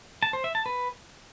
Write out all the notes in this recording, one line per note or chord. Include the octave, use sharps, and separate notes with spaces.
A5
C5
E5
A5
B4